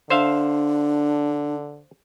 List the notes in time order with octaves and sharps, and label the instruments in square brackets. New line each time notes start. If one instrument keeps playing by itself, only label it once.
[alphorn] D3 [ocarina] D4 [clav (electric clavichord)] C5 E5 F5